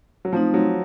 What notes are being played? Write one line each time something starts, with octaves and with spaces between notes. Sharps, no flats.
F#3
F3 A3 C4 D#4
F#3